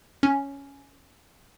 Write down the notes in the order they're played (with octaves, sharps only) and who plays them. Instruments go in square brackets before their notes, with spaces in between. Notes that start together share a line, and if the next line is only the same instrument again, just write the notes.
[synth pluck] C#4